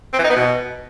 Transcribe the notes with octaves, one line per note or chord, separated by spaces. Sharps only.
C4
E3
D#4
B3
B2